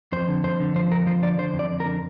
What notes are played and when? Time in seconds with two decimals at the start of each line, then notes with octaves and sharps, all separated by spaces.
0.12 F2 C5
0.28 D3
0.44 F2 C5
0.60 D3
0.75 F3 C5
0.91 F2 A#4
1.07 F3 C5
1.22 D3 D5
1.38 D3 C5
1.54 F2
1.59 D5
1.70 F2
1.80 A#4
1.85 D3